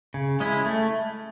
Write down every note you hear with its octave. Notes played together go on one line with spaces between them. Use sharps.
C#3
G#3 C#4 E4
A3